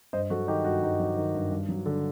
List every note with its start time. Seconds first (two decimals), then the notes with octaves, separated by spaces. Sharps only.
0.13 G2 C5 D#5
0.30 F#3 F#4 A4
0.47 D#3 D#4 G4
0.65 G2 F#4
0.82 G2 D#4
1.00 F#3
1.17 D#3
1.35 G2
1.52 G2
1.69 F#3
1.86 D3